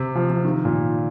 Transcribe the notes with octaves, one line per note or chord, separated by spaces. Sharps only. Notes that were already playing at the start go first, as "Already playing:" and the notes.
Already playing: C3
F3
F3
D#3
A#2